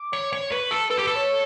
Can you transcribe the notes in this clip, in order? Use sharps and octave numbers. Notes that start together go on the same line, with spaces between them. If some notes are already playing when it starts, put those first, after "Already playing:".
Already playing: D6
C#5
C#5
B4 C#6
A4 A5
A4 B4
G4
A4 B4
C#5